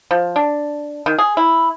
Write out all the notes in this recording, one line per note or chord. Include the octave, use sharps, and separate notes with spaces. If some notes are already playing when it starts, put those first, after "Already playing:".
F3
D4
D#3
G#4
E4